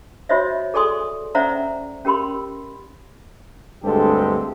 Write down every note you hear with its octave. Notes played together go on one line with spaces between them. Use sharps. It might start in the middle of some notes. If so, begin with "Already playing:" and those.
F4 F#4 C5 C#5 D#5 E5
G#4 A4 D5 G#5 C6 D#6
C#4 C5 D5 E5 F#5 A#5
C#4 G4 A#4 B5 C6
D2 G2 G#3 C4 G4 A4